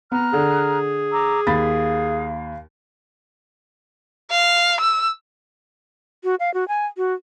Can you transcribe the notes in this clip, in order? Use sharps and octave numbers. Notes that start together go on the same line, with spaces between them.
B3 A#5 F6 F#6
D3 G#4
A#5 D6 E6
D#2 F5 B5 A6
F5
E6
F#4
F5
F#4
G#5
F#4